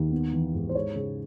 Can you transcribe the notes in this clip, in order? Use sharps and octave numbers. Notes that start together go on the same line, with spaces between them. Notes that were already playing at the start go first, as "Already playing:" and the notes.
Already playing: D#2
B3
E3
G#2
C5
G#3 C#5
C#3